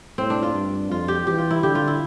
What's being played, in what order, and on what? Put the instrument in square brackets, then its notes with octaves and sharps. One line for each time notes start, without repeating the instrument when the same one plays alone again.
[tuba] A2 [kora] C4
[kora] D4
F4
[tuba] G2
[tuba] F2 [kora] F4
[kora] G4
[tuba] E3 [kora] G4
[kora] F4
E4
[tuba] D3 [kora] G4
[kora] F4
E4